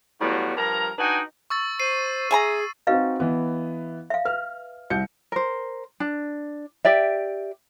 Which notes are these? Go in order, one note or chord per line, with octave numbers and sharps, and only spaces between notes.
A2 F#3 G3 B3 F4 F#4
G2 F3 A#4 A#5
D4 D#4 F#4 B4 G5 G#5
C#6 E6 A6
C5 C7 D#7
G#4 E5 G#5 A#5
C4 D#4 F#4 B4 D#5 F5
E3 B3
E5 F5
B4 F6
C2 G6 C#7
A#4 C5
D4
G4 D5 E5